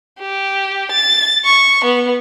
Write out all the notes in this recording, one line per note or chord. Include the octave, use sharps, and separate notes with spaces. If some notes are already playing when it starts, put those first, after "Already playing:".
G4
A6
C#6
B3